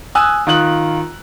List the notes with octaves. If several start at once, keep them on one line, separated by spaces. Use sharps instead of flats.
G#5 D#6 E6 F#6
D#3 F4 D#6 F#6 F#7